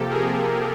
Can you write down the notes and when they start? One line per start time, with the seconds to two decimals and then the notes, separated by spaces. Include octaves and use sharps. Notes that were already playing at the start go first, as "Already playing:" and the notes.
Already playing: C3 F3 A#3 G4 A4
0.10 G#4 A#4